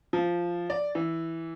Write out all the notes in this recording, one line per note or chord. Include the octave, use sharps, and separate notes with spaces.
F3
D5
E3